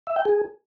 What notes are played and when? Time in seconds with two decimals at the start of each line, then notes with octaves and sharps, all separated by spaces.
0.07 E5
0.16 G5
0.25 G#4